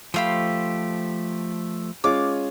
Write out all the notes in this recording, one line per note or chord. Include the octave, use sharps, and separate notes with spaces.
F3 A3 G4 C5 F5 B5
G#3 C#4 F4 D6